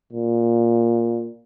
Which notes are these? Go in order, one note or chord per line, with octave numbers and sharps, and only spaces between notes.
A#2